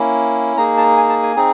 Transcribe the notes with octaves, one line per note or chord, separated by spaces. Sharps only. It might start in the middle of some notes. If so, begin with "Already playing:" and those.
Already playing: A#3 C#4 E4
A#3 D#4 G#4 A#5
A5
G#5
A5
G#5
C4 D#4 G#4